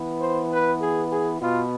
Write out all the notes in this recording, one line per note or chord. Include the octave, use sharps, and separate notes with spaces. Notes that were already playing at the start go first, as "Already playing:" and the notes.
Already playing: E3 B3
C5
B4
G#4
G#4
B2 B3 F4